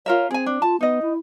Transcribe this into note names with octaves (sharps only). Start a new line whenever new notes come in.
F4 A#4 C#5 E5
C4 G#4 G#5
D4
F4 A5
B3 D#4 D#5
E4